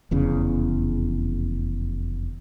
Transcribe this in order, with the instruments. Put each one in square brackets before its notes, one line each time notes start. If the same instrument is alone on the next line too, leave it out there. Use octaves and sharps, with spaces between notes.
[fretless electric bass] F1 E2 C#3